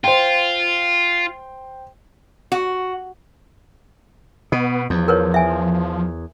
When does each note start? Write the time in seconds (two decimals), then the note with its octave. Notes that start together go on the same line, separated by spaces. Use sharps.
0.04 F4 C5 G5
2.52 F#4
4.52 B2 B3 D#5
4.90 E2 F3
5.08 A#4 B4 C#5
5.34 E5 G#5